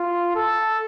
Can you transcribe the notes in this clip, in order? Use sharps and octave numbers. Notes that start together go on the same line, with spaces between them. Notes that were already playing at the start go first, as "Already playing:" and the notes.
Already playing: F4
A4